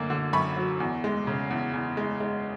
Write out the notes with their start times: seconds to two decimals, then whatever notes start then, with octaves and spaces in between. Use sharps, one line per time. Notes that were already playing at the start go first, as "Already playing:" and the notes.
Already playing: F#2 D3 A#3
0.10 D3
0.33 F#2 B5 C#6
0.56 F#3
0.80 E2
1.04 G#3
1.27 C#3
1.50 E2
1.73 E2
1.97 G#3
2.20 G#3